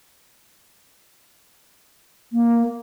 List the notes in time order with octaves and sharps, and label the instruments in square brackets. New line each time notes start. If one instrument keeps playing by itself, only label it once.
[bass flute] A#3